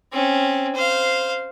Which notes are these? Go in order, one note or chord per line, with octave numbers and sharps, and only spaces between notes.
C4 C#4
C5 F5